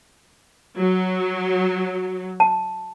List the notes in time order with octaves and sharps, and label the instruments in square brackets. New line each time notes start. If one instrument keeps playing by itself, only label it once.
[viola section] F#3
[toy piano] A5